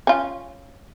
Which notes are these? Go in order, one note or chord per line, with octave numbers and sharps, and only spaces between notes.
C#4 F4